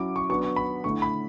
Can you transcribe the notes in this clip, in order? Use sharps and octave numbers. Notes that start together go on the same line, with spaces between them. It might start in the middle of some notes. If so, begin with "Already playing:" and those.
Already playing: F#3 C#4 E4 D6
C#6
F#3 B3 D4 C#6
C#6
B5
D3 A3 E4 C#6
B5